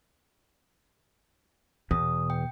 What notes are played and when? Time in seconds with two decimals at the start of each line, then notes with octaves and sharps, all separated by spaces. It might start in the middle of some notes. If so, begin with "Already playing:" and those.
1.91 E2 B2 D#6
2.30 G5